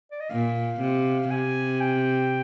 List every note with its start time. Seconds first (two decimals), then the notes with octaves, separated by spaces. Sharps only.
0.12 D5
0.21 D#5
0.30 A#2 F5
0.81 C3
1.30 C3 G#5
1.81 G5